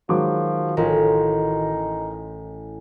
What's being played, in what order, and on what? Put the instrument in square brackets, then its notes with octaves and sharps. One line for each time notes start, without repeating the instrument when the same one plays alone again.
[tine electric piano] D#3 F#4 [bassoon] F3 [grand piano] F#3 G#3 D6
[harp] A1 [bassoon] D#4 [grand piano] F4 A#4 A#5